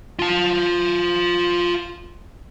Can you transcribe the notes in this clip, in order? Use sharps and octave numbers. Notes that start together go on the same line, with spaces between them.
F4 A5